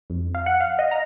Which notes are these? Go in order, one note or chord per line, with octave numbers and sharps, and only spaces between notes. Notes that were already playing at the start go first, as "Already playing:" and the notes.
F2
F5
F#5
F5
D#5
A#5